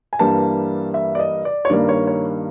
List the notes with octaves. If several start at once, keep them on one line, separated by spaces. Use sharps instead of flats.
G#5
G2 E3 G3 A#3 A5
E5
D5
D#5
D5
C#5
G2 D#3 G3 A#3 D5
C#5
C#5